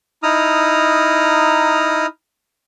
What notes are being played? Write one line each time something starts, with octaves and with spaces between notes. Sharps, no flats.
D#4 E4 A#5 D#6 F6